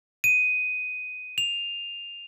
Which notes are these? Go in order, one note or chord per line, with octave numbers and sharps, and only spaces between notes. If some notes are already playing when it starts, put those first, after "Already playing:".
D#7
F7